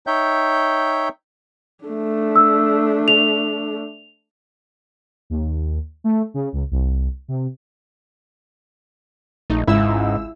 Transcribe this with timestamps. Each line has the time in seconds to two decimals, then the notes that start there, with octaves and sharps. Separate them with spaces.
0.07 D#4 C#5 E5 G5 G6
1.84 A3 D4
2.36 E6
3.08 F7
5.30 D#2
6.04 A3
6.34 C#3
6.53 C#2
6.71 C2
7.28 C3
9.50 A#1 A3 D#4
9.67 G#1 C#2 G#2 E4 E6